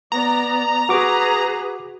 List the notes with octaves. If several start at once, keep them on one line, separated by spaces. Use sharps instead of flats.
B3 D5 A#5
F#4 G#4 B4 D6